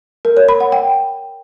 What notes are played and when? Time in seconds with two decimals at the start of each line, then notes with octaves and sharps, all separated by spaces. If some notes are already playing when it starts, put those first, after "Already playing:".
0.25 A#4
0.37 C#5
0.49 B5
0.60 F#5
0.72 G5